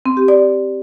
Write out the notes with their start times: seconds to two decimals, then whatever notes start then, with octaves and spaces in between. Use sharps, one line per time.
0.06 C4
0.17 G4
0.28 D5